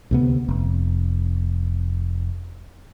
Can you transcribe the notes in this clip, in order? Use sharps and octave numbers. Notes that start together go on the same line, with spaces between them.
D2 C3 B3
F1